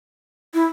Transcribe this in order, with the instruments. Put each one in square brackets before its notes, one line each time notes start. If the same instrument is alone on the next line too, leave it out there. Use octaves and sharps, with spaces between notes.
[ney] E4